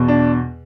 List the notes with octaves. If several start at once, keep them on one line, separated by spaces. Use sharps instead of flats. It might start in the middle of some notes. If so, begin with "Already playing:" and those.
Already playing: E2 B2
D4